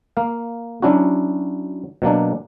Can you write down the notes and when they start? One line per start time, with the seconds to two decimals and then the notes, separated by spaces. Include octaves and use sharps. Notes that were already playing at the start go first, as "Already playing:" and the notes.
0.17 A#3 F5
0.82 F#3 C#4 D4 E4 F#4
2.02 B2 F#3 A#3 D4